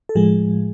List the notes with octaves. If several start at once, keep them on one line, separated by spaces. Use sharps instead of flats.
A4
A2 F3 G#3 G#4